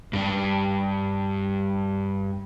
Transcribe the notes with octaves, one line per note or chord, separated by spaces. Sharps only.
G2 D4